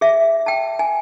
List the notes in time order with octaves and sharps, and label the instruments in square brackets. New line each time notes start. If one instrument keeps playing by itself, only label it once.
[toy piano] G#4 E5
G5 A5
G#5